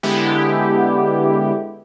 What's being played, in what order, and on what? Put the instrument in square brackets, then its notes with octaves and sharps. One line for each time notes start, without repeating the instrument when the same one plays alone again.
[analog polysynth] D3 G#3 B3 E4 G4